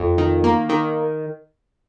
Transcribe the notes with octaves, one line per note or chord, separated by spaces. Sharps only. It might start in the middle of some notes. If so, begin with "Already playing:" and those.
Already playing: F2
D#3
A#3
D#3